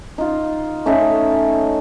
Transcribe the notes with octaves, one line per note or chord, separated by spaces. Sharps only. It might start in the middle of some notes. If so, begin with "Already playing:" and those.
D#4 F4
A3 C#4 D#4 E5